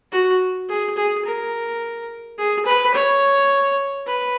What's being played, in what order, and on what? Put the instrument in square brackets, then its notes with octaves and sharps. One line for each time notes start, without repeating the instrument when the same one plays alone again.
[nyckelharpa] F#4
G#4
G#4
A#4
G#4
B4
C#5
B4